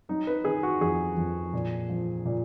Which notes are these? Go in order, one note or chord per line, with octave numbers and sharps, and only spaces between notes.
F#3 D#4
B4
D#3 G#4
F#4
F2 G#4
F2
A#2
F3
A#2